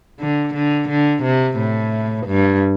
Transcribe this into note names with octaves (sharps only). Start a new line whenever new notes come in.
D3
D3
D3
C3
A2
G2